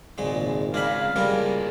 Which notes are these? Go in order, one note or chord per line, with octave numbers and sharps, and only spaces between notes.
G#1 C#2 A#2 G#3
C#3 G#3 D4 F5 B5
C#2 G3 A#3 F4 G#4 A#4